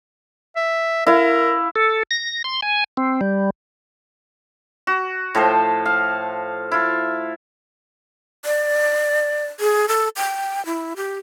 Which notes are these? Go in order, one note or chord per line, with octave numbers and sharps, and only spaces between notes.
E5
E4 A#4 F5
A4
A#6
C6
G#5
C4
G3
F#4
A2 F3 A4 C5
F5
E4 F4
D5
G#4
A4
G5
E4
G4